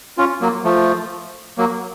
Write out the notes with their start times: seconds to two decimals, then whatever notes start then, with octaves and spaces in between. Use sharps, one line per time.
0.18 C#4 F4
0.41 F#3 A#3
0.64 F3 A3
1.58 F#3 A#3